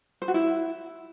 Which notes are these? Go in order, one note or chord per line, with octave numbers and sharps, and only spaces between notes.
C5
F#4
E4